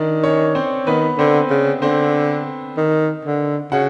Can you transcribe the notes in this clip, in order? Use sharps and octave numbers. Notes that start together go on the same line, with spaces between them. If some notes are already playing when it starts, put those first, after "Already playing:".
Already playing: D#3 D4 D5
C#4 C#5
C4 C5
D#3 B3 B4
D3 C4 C5
C#3
D3 C4 C5
D#3
D3
C#3 F#4 F#5